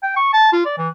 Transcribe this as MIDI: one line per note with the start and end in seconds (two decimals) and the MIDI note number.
0.03 0.14 79
0.16 0.33 85
0.33 0.51 81
0.53 0.65 65
0.66 0.76 74
0.78 0.88 52